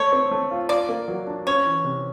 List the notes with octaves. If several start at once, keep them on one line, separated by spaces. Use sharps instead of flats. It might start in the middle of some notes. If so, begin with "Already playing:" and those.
Already playing: A3 C#5
C4
A3
F4
F4 D5
A#3
F#3
D4
C#4 C#5
E3
C3